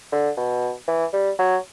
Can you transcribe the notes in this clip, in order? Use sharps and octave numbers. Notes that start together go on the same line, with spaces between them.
D3
B2
E3
G3
F#3